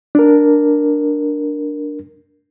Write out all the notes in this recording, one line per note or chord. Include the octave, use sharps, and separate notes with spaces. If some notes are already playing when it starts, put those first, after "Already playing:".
D4 A#4